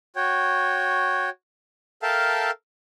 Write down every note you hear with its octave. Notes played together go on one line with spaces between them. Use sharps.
F#4 C#5 G5
A4 A#4 E5 F5 G5 A5